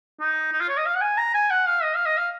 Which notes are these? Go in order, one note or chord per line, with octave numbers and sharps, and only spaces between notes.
D#4
D#4
F4
C#5
D#5
F5
F#5
G#5
A#5
G#5
F#5
F5
D#5
F5
D#5
F5